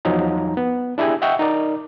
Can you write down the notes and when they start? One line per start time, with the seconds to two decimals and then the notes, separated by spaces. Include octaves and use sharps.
0.05 E2 F3 F#3 D#4 A#5
0.57 B3
0.98 D4 E4 G4 G#4 G#5
1.22 D#5 E5 F#5 G5 C#6
1.39 D#4 A#4 D5